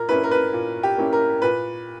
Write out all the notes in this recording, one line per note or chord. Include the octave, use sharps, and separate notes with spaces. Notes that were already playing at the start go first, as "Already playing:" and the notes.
Already playing: A#2 A#4
A#3 C#4 E4 B4
A#4
B4
A#2
G4
A#3 C#4 E4
A#4
A#2 B4